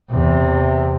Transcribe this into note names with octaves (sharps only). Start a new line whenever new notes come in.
E2 C3